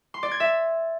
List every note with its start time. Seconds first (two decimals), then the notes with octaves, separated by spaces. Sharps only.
0.14 C6
0.23 D5
0.31 G#6
0.40 E5